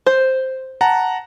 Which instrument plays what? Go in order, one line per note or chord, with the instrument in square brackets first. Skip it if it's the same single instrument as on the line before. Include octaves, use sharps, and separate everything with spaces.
[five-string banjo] C5
[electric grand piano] F#5 A5 A#5